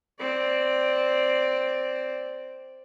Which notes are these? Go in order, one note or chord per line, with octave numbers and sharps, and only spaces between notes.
C4 D5